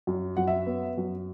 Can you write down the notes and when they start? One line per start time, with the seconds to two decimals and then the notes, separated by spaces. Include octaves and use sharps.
0.07 F#2
0.37 F#2 F#5
0.47 E5
0.67 B3
0.97 F#2